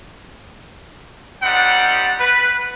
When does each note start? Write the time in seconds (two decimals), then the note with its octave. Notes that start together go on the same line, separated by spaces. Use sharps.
1.43 G3 C4 D#4 F#5
2.21 B4